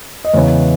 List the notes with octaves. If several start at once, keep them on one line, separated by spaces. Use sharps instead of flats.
D#5
E2 C#3 E3 G#3 B3 C#5